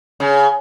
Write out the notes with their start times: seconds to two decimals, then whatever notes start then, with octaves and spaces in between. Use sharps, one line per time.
0.20 C#3